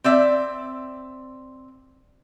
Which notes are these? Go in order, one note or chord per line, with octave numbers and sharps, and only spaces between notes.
C4 D5 E5